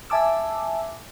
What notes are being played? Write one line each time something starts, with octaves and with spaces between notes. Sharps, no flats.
E5 G#5 A5 D6 E6